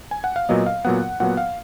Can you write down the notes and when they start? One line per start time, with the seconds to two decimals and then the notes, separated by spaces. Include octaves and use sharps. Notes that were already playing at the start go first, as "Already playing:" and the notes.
0.11 G#5
0.24 F#5
0.36 F5
0.49 A#2 F#3 B3 D#5
0.67 F5
0.85 A#2 F#3 B3 F#5
1.20 A#2 F#3 B3 F#5
1.37 F5